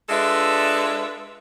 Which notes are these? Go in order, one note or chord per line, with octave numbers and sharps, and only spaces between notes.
G#3 D4 F4 A4 B4 E5